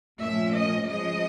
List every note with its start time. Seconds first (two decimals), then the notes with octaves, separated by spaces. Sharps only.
0.20 A#2 F3 A3 C#4 E5
0.53 D#5
0.86 C#3 F3 G#3 D#5